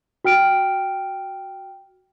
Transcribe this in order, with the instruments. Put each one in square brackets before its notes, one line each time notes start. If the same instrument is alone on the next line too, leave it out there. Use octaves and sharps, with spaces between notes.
[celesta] F#4 G5 F6 D7